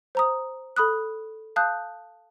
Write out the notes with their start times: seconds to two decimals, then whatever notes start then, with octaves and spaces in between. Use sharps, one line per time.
0.15 C5 A#5 D#6
0.76 A4 B5 D#6 F#6
1.56 F5 A5 D#6 F#6 G6